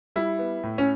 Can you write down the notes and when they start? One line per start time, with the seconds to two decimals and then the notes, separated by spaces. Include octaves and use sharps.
0.16 G3 E4
0.39 B3
0.63 A2
0.78 C#4